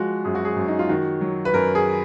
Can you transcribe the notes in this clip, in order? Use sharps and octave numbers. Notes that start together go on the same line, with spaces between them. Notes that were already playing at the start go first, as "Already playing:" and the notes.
Already playing: F3 G#3 F4 F#4
F#2 G#4
F#4
G#4
F#2
D#4
F4
D#3 F#4
F#3
B4
F#2 A#4
G#4